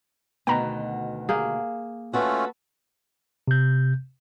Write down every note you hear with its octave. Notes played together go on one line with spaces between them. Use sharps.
D2 B2 D#3 G5 A#5 B5
A#3 G#4 G6
A3 C#4 F4 F#4 A4 B4
C3 G6